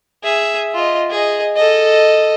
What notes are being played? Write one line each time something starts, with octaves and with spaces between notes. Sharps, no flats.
G#4 E5
F4 D#5
G#4 D#5
A4 D#5